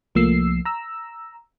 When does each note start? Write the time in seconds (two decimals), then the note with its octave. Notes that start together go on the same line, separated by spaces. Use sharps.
0.15 C2 F3 A3 A#3 E6 C7
0.65 A#5 E6